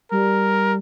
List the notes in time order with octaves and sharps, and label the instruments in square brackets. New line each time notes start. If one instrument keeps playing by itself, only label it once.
[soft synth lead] G3 [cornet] A#4